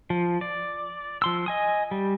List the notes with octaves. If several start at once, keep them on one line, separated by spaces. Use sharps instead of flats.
F3
D5
F3 C6 E6
D#5 G#5 D#6
G3